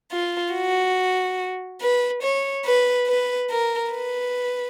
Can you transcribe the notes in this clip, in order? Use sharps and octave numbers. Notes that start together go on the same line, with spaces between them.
F4
F#4
B4
C#5
B4
B4
A#4
B4